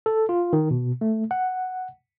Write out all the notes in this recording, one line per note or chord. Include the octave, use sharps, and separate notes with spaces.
A4
F4
D#3
B2
A3
F#5